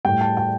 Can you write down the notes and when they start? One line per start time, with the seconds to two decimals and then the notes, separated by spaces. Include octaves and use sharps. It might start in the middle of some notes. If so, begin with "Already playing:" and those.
0.05 A2 G3 G5
0.21 A5
0.37 G5